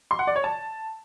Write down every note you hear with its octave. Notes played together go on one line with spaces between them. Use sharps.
C6
F#5
D5
C#5
A5